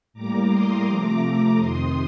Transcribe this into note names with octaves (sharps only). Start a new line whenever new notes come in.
A2 G3 A#3 A#5 D6
C6 D#6
C3 F3 A3 A#5 D6
A#5 D6
F2 C3 D#3 C6 D#6